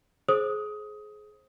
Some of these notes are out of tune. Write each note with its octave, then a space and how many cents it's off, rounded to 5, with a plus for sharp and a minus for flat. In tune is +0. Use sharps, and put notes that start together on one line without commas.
G#4 +30 C5 +20 D#6 +15